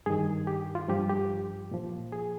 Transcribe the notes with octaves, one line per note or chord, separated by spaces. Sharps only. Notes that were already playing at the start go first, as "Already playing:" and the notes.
G2 D#3 G#4
G4
F4
G2 F3 G4
G4
A#2 F3
G#4